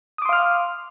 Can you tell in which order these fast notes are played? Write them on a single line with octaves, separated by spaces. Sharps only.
D#6 D6 C6 F5 F6